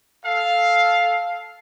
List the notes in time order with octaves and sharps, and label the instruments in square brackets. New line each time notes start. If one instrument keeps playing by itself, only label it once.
[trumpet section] A4 F5